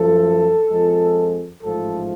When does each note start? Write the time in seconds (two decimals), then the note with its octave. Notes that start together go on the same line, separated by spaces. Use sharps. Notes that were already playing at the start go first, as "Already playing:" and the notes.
Already playing: F#2 F3 A3 A4
0.70 F2 F3 G#3
1.62 A1 G#2 F3 A3 A4